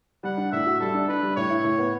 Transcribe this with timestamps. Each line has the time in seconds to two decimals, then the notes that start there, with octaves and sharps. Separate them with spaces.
0.23 G3 F#5
0.37 D4
0.52 A2 E5
0.66 F#4
0.80 G3 A4
0.94 D4
1.08 D4 B4
1.22 G3
1.36 A2 C#5
1.50 E4
1.64 A2
1.78 B3